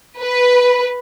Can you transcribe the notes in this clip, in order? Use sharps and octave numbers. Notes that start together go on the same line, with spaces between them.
B4